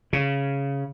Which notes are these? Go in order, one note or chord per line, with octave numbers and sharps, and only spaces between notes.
C#3